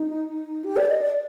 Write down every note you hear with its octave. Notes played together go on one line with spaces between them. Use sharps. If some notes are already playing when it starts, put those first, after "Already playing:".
Already playing: D#4
G4
D5
D#5
D5